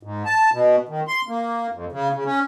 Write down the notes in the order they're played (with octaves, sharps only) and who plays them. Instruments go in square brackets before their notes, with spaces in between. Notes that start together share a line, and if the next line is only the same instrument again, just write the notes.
[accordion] G#2
A5
B2
D#3
C6
A#3
F2
C#3
C#3
C#4